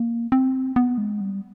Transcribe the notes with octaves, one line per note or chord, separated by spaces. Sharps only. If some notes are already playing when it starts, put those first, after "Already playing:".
Already playing: A#3
C4
B3
G#3
G3